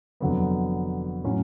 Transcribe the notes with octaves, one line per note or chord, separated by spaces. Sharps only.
F1 F2 D3 F#3 B3
A2 F#3 C#4